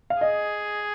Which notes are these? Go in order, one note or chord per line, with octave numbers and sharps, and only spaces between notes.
F5
G#4 D#5